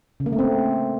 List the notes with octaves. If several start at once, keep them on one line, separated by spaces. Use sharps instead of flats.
C#3
A#3
A3
C4